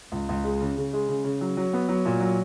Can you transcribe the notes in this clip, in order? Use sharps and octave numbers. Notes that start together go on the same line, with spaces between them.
C#2
C#2
G#3
C#3
C#3
G#3
C#3
C#3
F#3
F#3
B3
F#3
A#2
F#3